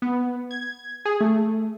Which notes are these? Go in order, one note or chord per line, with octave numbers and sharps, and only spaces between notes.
B3
G#6
G#4
A3